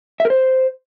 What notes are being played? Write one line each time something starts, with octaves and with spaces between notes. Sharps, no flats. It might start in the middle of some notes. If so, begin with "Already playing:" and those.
E5
A#4
C5